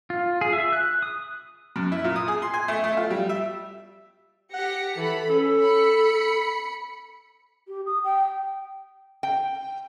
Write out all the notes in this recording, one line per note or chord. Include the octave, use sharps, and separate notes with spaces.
F4
G#4
E5
F#6
D#6
F#2
E4
A#2
D#6
G#4
C6
G#5
A3
A3
F4
G3
E5
G4 F#5 A#6 C#7
E3 A4 B5
C#4 A4
B5 C#7
G4
D#6
G5
G5